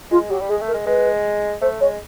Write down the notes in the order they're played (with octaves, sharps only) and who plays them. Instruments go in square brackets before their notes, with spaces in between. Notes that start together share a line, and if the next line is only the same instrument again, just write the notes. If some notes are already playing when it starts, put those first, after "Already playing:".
[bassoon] G#3 [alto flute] F4
[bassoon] F#3 [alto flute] G4
[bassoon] G3
[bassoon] G#3 [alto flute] G#4
[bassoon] A3
[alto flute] A#4
[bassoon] G#3
[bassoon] G#3 [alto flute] B4
[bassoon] A3 [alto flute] C5
[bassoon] G#3 [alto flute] C#5